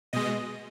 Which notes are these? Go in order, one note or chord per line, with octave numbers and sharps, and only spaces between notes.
B2 G#3 D#5